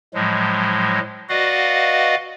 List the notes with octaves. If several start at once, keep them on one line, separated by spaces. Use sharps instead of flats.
A2 F3 F#3 G#3
F#4 B4 D5 D#5 F5 F#5